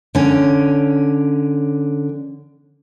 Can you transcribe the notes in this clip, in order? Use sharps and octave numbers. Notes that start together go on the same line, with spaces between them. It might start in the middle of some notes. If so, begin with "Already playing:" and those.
D3 C#4